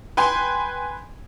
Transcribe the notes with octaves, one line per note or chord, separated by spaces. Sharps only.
B4 G5 G#5 C6